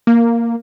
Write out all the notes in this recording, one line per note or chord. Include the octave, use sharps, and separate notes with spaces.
A#3